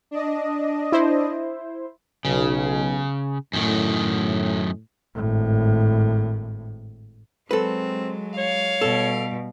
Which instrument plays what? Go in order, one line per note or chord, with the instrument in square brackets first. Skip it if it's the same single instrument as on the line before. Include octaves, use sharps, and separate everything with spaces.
[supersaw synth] D4 D#5
[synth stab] E4 C5
[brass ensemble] B1 [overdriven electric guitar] C#3
[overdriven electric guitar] F#2 D#3 [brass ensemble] A2
[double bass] G#1 A2
[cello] F#3 G#3 [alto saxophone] C4 [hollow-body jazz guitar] A4 B4
[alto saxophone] C#5 [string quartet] F5
[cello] B2 G3 [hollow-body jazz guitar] A4